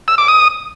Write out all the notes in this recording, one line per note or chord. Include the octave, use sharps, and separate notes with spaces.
E6
D6
D#6